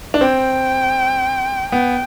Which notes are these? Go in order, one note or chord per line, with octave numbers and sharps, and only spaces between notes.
D4
C4 G5
B3 G5